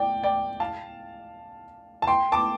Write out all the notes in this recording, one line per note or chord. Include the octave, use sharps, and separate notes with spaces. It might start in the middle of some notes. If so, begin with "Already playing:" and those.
Already playing: D5 G5
D5 G5
F5 A5
A5
G5 C6
A5 D6